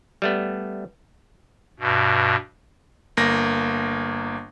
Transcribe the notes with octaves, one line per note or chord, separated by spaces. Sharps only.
G3 A3 B3
G2 B2
G1 A#3 A#6